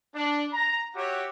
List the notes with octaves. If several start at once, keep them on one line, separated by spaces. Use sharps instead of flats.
D4
A#5
F#4 G4 C#5 E5 F#5